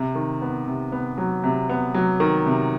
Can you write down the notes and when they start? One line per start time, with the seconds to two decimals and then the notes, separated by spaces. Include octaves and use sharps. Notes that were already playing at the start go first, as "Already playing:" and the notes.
Already playing: C3
0.15 D#3
0.42 B3
0.67 C3
0.92 B3
1.18 F#3
1.44 C3
1.70 B3
1.94 F#3
2.20 D#3
2.46 C3